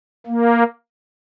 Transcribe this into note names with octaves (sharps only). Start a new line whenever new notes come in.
A#3